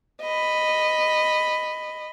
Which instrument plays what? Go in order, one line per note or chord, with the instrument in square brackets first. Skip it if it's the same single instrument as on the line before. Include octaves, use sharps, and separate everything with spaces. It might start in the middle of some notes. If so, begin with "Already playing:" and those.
[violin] D#5 B5